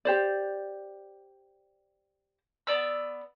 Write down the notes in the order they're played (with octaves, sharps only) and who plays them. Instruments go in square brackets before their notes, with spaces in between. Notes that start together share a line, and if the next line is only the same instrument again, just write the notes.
[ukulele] G4 C5 D5
[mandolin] B3 D#4 D5 E6